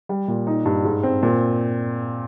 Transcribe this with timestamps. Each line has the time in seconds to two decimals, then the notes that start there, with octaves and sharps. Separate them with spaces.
0.09 G3
0.28 A#2
0.47 D#4
0.65 G2
0.85 G#2
1.03 C4
1.23 A#2